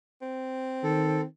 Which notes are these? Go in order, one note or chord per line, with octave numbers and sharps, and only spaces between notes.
C4
D#3 A4